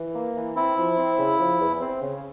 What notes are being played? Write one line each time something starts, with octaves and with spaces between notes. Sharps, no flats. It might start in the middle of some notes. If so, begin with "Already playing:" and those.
Already playing: E3
A#3
E3
C4 E4
F3
C4
C#3
F3
E2
C4
C#3